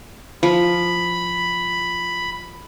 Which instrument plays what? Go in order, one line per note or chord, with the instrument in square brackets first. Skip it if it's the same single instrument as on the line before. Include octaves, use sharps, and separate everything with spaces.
[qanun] F3 [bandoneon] B5